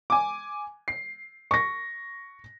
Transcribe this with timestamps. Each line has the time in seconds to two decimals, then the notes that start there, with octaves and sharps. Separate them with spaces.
0.10 G#5 D6
0.88 C7
1.51 C#6 A#6